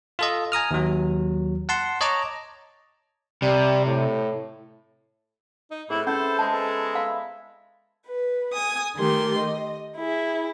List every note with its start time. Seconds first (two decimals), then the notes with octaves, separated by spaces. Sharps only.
0.19 F4 A4 D#5
0.52 G#5 A#5 D#6 F6
0.71 D#2 F#3
1.69 F#5 A5 C6
2.01 C#5 D#5 A5 A#5 D6
3.42 C3 G3
3.86 A2
5.71 D#4
5.90 A2 C4 E4 G#4 B4 F#5
6.07 C#4 E4 A4 C5
6.39 G#3 A5
6.53 B3 A4 A#4
6.95 E5 F5 B5 C6
8.05 B4
8.52 G#5 D#6
8.95 D#3 A3 G4 A#4 C6
9.36 D#5
9.96 E4 G#4